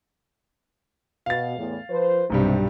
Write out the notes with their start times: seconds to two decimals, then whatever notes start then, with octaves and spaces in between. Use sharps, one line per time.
1.26 B2 F5 A6
1.57 E2 A2
1.90 F3 B4 C5
2.30 B1 G2 C3 G3